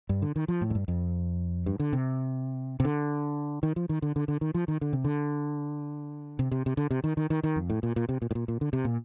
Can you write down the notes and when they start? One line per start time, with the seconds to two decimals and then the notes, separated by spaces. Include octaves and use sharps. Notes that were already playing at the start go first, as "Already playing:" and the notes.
0.09 G2
0.22 D3
0.36 D#3
0.48 F3
0.61 A2
0.70 F2
0.75 G2
0.88 F2
1.66 G2
1.80 D3
1.93 C3
2.80 C3
2.85 D3
3.63 D#3
3.76 F3
3.89 D#3
4.02 D3
4.16 D3
4.28 D3
4.41 D#3
4.54 F3
4.68 D#3
4.81 D3
4.93 C3
5.05 D3
6.39 C3
6.51 C3
6.66 C3
6.77 D3
6.91 C3
7.04 D#3
7.17 D#3
7.30 D#3
7.43 D#3
7.56 F2
7.70 A2
7.83 A#2
7.96 A#2
8.09 C3
8.22 A#2
8.31 A2
8.35 A#2
8.48 A#2
8.61 D3
8.73 C3
8.85 A#2